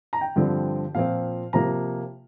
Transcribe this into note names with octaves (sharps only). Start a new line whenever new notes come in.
A#5
G5
G2 D3 F3 C4
A#2 F3 C4 F5
C3 F3 A#3 A#5